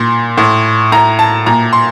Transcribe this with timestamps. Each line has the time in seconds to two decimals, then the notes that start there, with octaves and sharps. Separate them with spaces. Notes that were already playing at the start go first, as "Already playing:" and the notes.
Already playing: A#2 C6
0.37 A2
0.92 A2 A#5
1.19 A5
1.46 A#2 A#5
1.73 C6